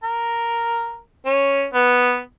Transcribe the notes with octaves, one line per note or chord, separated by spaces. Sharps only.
A#4
C#4
B3